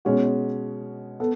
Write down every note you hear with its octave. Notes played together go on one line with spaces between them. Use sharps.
B2 G#3 C#4 F#4
B3 A4